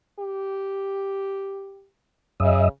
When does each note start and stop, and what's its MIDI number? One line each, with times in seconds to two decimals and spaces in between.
0.19 1.87 67
2.40 2.69 42
2.40 2.66 49
2.40 2.69 75
2.40 2.69 76